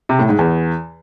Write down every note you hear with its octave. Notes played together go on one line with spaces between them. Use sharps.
C3
A2
G#2
E2